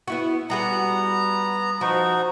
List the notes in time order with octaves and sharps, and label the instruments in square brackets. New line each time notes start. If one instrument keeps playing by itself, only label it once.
[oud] B3 E4 F#4
[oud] G3 F#4 G#4 [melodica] B3 A#5
[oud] F3 [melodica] D#4 F#4